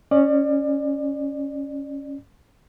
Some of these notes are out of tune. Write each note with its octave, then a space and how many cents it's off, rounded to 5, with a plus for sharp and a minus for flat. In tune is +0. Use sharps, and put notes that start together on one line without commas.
C#4 +0 D5 +30